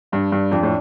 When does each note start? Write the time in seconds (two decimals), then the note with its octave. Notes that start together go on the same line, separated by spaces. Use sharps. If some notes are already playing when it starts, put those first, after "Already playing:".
0.12 G2 D4
0.32 G2
0.51 F2 D4
0.63 A2